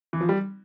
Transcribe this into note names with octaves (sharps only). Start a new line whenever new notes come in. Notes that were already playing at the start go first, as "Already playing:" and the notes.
E3
F3
G3